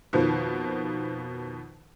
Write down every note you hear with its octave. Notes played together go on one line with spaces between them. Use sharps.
F2 B2 D#3 F3